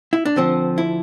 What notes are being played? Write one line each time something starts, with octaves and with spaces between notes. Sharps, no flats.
E4
D4
D2 D3 F3 C4
E4